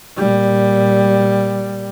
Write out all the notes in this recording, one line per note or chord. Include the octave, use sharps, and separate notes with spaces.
A#2 G3